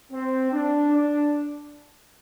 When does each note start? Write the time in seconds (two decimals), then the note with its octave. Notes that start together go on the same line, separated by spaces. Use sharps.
0.12 C4
0.53 D4
0.93 D4